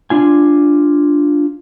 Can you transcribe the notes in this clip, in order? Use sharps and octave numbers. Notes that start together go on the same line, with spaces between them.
D4 F4 G#5